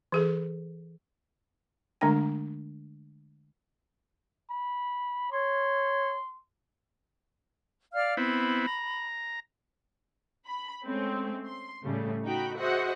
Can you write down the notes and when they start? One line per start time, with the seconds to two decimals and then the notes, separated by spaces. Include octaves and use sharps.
0.12 E3 G#4 A4
2.01 D3 G#3 A3 D4 G5
4.50 B5
5.32 C#5 C6
7.94 D5 F5 F6
8.17 B3 C4 E4 B5
8.67 A#5
10.47 B5
10.84 G#3 A3 C4 C#4
11.46 C6
11.83 A2 C#3 G3 A3 C#4
12.24 D#4 F#4 G5 B5
12.57 F#4 G#4 C5 D#5 E5 F#5